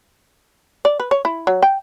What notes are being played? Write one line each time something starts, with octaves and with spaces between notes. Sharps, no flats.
D5
B4
C#5
E4
F#3
G5